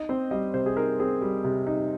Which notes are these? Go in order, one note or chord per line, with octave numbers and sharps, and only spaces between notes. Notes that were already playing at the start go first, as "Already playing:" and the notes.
Already playing: D#4 D#5
C4 C5
G3 D#5
C3 C5
G#4
D#4 A#4
C4 G#4
G3
C3
D#4